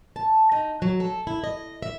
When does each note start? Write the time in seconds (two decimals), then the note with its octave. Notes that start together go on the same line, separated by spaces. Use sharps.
0.16 A5
0.52 D#4
0.82 F#3
1.00 A4
1.27 E4
1.44 D#5
1.82 E5